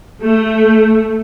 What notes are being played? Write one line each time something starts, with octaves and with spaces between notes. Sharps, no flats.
A3